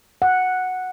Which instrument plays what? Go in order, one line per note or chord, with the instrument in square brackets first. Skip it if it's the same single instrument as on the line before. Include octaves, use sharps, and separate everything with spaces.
[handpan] F#5